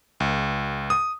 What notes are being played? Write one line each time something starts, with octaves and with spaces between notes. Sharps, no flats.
C#2
D#6